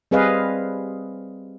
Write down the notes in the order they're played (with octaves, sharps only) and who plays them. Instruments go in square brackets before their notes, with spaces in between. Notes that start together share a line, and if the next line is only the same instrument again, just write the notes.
[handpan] G3 C4 G#4 B4 D#5 F5